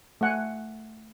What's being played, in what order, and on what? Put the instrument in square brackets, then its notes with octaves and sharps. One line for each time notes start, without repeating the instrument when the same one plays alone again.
[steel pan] A3 F#5 G#5